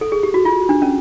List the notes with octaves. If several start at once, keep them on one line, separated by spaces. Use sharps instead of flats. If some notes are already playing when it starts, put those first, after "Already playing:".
A4
G#4
G4
F#4
F4
D4
C#4